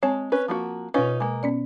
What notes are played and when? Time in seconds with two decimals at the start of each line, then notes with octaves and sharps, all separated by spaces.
0.03 G#3 C4 C#5 A5
0.32 C#4 B4
0.48 F3 A#3 F#4
0.94 B2 C#4 D#4 F4 B4
1.20 G#3 A#3
1.43 B3 C#4 D5